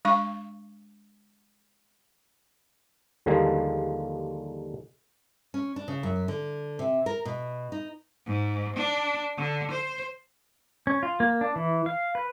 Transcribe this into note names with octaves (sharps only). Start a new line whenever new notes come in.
G#3 D4 F5 C#6
D#2 D3 F3 G3 G#3 A#3
C#4
D4
C#3
F#2
D3
C3
A#4
B2
D#4
G#2
D4
D3
C5
C#4
F4
A#3
D4
E3
F5
B4